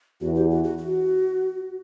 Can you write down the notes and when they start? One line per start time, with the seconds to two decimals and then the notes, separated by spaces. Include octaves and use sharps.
0.21 E2 F#4
0.35 G4
0.50 F#4
0.64 F#4
0.78 F#4